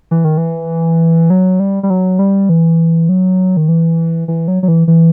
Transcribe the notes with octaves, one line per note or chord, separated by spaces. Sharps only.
E3
D#3
E3
F#3
G3
G3
F#3
G3
E3
F#3
D#3
E3
E3
F#3
F#3
E3
E3